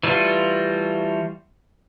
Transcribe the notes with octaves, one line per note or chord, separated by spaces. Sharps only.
E3 G3 A3 F4 F#4